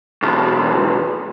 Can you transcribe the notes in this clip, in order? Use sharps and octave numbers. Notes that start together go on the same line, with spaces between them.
B1 E2